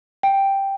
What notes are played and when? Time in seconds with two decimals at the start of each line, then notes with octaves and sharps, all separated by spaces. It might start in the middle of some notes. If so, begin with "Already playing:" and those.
0.23 G5